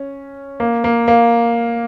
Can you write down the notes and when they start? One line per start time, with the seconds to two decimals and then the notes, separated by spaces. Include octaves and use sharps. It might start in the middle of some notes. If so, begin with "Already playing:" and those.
Already playing: C#4
0.60 A#3
0.84 A#3
1.08 A#3